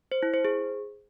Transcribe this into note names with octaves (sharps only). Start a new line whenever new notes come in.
C5
E4
C5
G#4